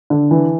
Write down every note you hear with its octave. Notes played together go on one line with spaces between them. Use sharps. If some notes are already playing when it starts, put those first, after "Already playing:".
D3
E3